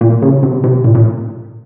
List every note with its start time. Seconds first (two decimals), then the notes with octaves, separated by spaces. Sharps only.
0.01 A#2
0.22 C#3
0.43 C3
0.64 C3
0.84 A#2
0.95 A#2